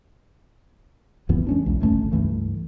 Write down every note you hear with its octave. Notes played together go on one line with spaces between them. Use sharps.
C#2 F#2 E3 B3
G#3 C#4 D4
B1 E2
G1 C#2 A3 C#4
C#2 G2 E3 A3